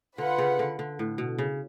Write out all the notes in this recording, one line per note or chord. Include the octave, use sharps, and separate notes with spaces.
D3 F4 B4 F#5
C#3
D3
D3
A2
B2
C#3